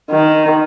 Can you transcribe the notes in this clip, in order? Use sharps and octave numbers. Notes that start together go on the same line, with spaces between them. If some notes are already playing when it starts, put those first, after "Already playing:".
D#3